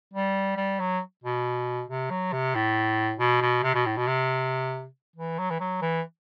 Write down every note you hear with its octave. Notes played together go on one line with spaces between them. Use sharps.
G3
G3
F#3
B2
C3
F#3
C3
A2
B2
B2
C3
B2
A2
B2
C3
E3
F#3
E3
F#3
E3